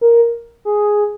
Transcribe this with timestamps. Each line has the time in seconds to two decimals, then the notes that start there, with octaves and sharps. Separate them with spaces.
0.01 A#4
0.65 G#4